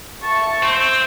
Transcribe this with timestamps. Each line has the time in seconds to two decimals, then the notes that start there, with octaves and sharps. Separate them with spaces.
0.23 E5 A5 C#6
0.63 C4 C5